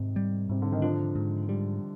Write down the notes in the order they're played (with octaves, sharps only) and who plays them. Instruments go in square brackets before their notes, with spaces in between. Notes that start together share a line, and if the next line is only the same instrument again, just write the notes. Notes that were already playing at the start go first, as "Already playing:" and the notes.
Already playing: [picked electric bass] G#2 [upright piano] C3 D#3
[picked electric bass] G3
[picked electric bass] G#2 [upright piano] C3
[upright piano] D3
D#3
[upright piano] D3 F3 [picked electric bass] D4
[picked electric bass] G#2
G3